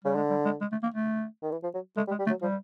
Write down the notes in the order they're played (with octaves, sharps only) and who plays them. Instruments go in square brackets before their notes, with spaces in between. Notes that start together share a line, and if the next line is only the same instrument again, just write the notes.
[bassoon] C#3 [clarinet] G3
[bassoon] D3 [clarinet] G#3
[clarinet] G3
G#3
G#3
A3
A#3
A3
[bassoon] D#3
E3
F3
F#3
[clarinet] G#3 [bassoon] A3
[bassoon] G3
[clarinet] G#3
[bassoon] G3
[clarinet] A3
[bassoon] F#3
[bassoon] F3 [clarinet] G3